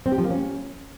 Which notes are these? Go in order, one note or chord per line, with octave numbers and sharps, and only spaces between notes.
C4
G4
F3
A#3
C#4